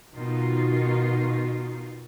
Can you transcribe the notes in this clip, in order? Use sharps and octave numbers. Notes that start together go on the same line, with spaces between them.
B2 D#3 D#4 F4